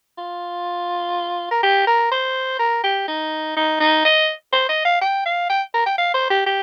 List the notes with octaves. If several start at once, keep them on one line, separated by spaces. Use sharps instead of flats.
F4
A#4
G4
A#4
C5
A#4
G4
D#4
D#4
D#4
D#5
C5
D#5
F5
G5
F5
G5
A#4
G5
F5
C5
G4
G4